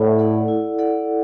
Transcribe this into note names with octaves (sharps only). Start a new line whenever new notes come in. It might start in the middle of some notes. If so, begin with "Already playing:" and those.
Already playing: A2 E4 A4 D5 F#5
A4 D5 F#5
E4
A4 D5 F#5